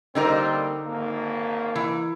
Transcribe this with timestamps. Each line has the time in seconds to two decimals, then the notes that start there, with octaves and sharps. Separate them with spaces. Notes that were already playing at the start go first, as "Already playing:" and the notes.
0.15 D3 G3 A#3 C4 D#4 A#4
0.86 G#1 A#3
1.75 E3